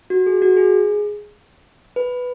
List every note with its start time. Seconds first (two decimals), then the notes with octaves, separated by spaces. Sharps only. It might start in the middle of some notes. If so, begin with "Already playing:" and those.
0.10 F#4
0.26 G#4
0.42 F#4
0.57 G#4
1.96 B4